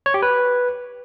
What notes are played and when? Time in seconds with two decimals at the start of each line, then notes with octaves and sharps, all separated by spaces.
0.06 C#5
0.14 G4
0.22 B4